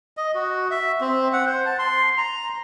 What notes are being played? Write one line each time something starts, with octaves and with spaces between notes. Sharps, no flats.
D#5
F#4
E5
C4
F#5
C5
A5
C6
A#5